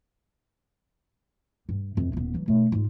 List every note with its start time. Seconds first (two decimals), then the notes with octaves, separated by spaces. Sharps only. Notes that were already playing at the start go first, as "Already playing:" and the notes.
1.69 G2
1.97 F2 E3
2.13 D#1 B3
2.34 E3 F#3
2.48 B2 A3
2.72 G#2 F4